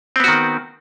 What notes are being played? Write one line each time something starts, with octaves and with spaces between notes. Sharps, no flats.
D#3 B3 C4 F#4